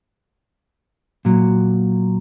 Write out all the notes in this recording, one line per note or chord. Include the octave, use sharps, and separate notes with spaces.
A#2 F#3